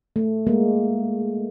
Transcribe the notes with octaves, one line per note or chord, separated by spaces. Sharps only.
A3
G#3 A#3